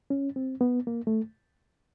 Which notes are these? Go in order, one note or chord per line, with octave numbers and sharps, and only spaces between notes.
C#4
C4
B3
A#3
A3